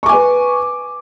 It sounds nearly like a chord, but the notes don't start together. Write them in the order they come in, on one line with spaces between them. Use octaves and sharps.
C#6 D6 G#5 B4